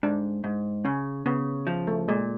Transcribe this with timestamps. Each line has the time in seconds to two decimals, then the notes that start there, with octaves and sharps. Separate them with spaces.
0.03 G#2 D4
0.44 G#2
0.85 C#3 C#4
1.26 C#3 B3
1.67 F3
1.87 A3
2.08 A#2 G#3